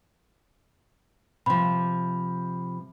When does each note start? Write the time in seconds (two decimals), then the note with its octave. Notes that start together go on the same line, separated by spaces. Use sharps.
1.46 C3 F3 B5